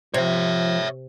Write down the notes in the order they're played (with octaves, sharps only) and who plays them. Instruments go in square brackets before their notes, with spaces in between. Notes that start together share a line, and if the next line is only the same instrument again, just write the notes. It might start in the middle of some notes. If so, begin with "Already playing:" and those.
[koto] C3 [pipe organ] F3 [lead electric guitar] C#5 E5